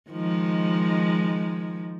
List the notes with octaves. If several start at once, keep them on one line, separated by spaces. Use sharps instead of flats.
D#3 F3 G#3